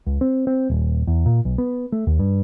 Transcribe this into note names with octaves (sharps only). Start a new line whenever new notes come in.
C#2
C4
C4
D#1
E2
A#2
B1
B3
A3
D#2
G2